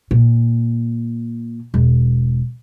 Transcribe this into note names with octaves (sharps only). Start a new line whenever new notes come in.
A#2
E1